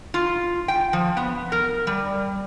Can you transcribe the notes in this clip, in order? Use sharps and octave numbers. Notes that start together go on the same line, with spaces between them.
F4
G5
F3
B3
A#4
G3